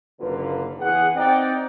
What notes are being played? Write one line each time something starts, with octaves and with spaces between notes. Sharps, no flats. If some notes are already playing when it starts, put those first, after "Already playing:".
F#1 D3 A#3 F4 B4
E2 G#4 F#5
C4 D#4 D5 G5